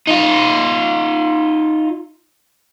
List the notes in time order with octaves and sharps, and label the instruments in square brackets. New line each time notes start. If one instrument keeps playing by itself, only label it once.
[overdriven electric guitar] D#4 F4